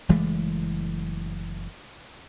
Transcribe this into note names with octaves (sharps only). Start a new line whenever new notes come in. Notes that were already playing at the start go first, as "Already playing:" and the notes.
F#1 E3 G#3 A3